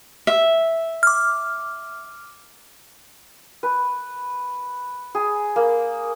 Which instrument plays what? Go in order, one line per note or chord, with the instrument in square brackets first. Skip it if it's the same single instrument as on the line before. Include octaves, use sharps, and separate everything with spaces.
[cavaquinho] E5
[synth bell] D6 F6
[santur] B4
G#4
A#3